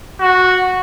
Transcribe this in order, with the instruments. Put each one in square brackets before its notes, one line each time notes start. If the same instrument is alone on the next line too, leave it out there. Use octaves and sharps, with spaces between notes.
[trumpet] F#4